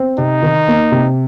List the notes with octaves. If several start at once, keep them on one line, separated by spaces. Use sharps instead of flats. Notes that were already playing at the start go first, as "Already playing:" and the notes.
Already playing: C4
C3 D#4
D#3
A#3
C3